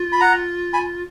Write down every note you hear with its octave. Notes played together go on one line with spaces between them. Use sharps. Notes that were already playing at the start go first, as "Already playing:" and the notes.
Already playing: F4
B5
F#5 A#5
G#5 B5